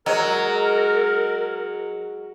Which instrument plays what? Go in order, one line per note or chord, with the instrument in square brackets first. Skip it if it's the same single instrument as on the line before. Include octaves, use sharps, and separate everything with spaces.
[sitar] F#3 [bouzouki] G#3 [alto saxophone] A#4